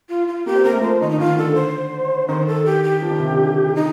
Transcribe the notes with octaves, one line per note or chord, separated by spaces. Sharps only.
F4
F4
A#3 G4
C4
A#3 A#4
A3
F3 C5
D#3 D#5
D#4
D#3 F4
D3 A4
C5
D#3 C5
A4
G4
G4
F3
D#3
C3
D3
D#4